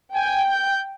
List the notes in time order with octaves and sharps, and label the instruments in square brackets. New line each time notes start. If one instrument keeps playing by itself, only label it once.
[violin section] G5 [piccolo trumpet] G#5
[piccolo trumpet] G6